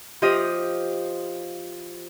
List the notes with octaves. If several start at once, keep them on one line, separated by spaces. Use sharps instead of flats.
F3 F4 G4 D#5